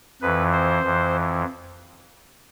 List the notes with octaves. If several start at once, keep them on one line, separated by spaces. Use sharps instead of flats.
F2 E3 B4
C5
F2 E3